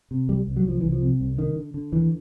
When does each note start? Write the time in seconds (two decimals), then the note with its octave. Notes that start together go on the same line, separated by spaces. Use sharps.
0.11 C3
0.29 C2 G3
0.47 C2
0.56 F#3
0.65 C2 F3
0.80 C2 E3
0.92 F3
1.02 C3
1.20 C2
1.38 D3 D#3
1.56 D3
1.74 D3
1.92 D#2 E3